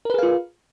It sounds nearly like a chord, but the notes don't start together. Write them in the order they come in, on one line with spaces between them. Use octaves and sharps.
A#4 B4 G#4 F5 F4